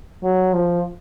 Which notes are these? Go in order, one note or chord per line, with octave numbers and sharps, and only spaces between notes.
F#3
F3